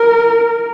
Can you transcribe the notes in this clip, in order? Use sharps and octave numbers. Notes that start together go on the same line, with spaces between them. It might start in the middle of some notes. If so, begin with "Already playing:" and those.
Already playing: A#4